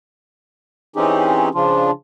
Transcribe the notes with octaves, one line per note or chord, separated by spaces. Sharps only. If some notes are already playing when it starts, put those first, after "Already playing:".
E3 C4 C#4 D#4 G4 G#4
C#3 F3 D4 F4